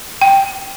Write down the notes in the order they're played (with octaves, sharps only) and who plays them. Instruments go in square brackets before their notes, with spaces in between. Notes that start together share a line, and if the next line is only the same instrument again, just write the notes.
[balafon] G5